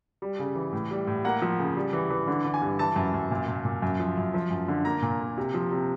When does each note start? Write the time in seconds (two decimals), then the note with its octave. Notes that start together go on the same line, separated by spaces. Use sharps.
0.22 G3
0.39 C#3
0.56 E3
0.73 A2
0.91 G3
1.07 A2
1.24 A#3 F#5
1.42 F3
1.59 C#3
1.76 G3
1.93 E3
2.10 E3
2.27 D3
2.44 D3
2.54 G#5
2.62 G2
2.79 E3 A5
2.96 F#2
3.14 F#2
3.31 A#2
3.48 A#2
3.65 A#2
3.82 F#2
4.00 F3
4.17 F#2
4.34 F3
4.51 F#2
4.68 D3
4.85 A#3 A#5
5.02 A#2
5.20 A#3
5.38 C3
5.54 F3
5.72 C3